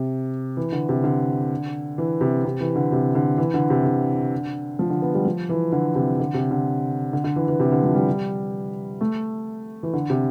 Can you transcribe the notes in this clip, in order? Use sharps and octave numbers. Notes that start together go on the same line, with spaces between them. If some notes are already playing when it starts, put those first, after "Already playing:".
Already playing: C3
E3
D3
C3
D3
E3
C3
C3
E3
D3
C3
D3
E3
D3
C3
D3
F3
D3
B3
G3
F3
E3
D3
C3
D3
C3
D3
D3
D3
E3
E3
C3
D3
F3
G3
A3
E3
D3
C3